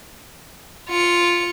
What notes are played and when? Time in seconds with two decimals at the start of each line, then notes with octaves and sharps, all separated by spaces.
0.89 F4 C#7